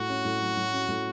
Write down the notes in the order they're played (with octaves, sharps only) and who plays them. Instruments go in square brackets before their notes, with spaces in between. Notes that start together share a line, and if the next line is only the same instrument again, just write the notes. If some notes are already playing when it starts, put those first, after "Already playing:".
Already playing: [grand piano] A2 [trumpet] F#4
[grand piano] C#4
A2
F#3
A2
C#4
A2